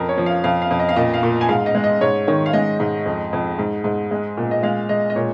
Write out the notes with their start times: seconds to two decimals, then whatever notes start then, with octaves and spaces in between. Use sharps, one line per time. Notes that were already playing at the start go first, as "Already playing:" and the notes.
Already playing: F2 A#4
0.09 C#5
0.18 F3
0.26 F5
0.44 F2 F5
0.62 F5
0.71 F2
0.79 D#5
0.89 F5
0.96 A#2 D#5
1.14 F5
1.23 A#2
1.41 G#5
1.49 G#2 F5
1.66 D#5
1.75 G#3
1.84 D#5
2.01 G#2 C#5
2.27 D#3 C#5
2.46 F5
2.53 G#3 D#5
2.80 G#2
3.06 F2
3.33 F2
3.58 G#2
3.84 G#2
4.11 G#3
4.37 A#2
4.51 D#5
4.63 G#3 F5
4.89 G#3 D#5
5.10 D#5
5.16 A#2 C#5